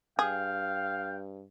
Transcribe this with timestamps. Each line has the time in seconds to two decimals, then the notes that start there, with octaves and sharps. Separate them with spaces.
0.19 G2 G#4 F5 G5